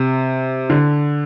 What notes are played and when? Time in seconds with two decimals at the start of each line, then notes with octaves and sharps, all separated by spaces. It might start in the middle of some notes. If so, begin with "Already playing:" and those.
Already playing: C3
0.70 D3